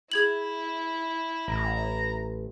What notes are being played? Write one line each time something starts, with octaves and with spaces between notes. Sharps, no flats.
E4 G#4 G#6 F#7
A1 A#5